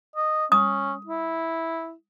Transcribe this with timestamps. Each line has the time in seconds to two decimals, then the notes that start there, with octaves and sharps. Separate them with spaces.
0.16 D#5
0.52 C#4 D#6
1.06 E4